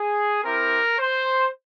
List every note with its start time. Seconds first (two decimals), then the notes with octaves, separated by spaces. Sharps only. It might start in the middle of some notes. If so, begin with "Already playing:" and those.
Already playing: G#4
0.43 C4 E4 G4 A#4
0.98 C5